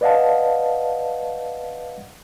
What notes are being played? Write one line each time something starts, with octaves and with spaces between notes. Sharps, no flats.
B4 D5 D#5 F5 F#5 A5